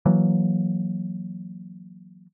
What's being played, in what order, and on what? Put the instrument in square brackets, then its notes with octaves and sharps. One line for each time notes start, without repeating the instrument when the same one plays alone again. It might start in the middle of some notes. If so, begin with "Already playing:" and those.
[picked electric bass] E3 F#3 A#3